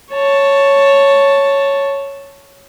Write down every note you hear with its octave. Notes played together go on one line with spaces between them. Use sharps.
C#5 A5